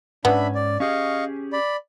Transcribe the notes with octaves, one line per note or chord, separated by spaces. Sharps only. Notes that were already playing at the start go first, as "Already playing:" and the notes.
G#2 B3 C#4 D4 E5 B5
D5
C#4 G4 G#4 D#5 F5 C#6
D5 B5